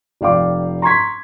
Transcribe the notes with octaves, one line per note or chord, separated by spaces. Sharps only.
F1 D5 F5 G5 D6
A#5 C6 C#6 G#6 B6